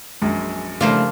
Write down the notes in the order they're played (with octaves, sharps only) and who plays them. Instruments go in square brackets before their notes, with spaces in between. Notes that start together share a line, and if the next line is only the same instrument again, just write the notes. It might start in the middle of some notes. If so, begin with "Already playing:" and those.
[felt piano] A#1 F#2 G#3
[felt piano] G2 C#3 [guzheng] F3 A#3 F4 [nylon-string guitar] A3 E4 D5